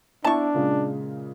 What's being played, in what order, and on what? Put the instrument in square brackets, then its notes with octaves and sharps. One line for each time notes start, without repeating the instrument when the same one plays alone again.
[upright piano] B3 E4 [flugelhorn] D4 [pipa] A5 C#6
[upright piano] A#2 C#3 G#3